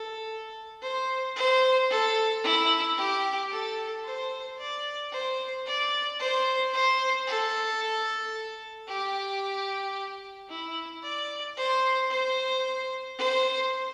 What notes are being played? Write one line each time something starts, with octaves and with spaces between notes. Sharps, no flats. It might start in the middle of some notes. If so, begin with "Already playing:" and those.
Already playing: A4
C5
C5
A4
E4
G4
A4
C5
D5
C5
D5
C5
C5
A4
G4
E4
D5
C5
C5
C5